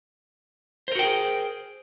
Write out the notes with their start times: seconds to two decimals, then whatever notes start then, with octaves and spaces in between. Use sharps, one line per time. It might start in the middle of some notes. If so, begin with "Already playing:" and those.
0.88 C5
0.92 A#4
0.95 F#4
0.99 G5
1.03 G#4